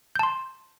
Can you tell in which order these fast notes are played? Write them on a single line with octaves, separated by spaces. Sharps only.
G6 A5 C6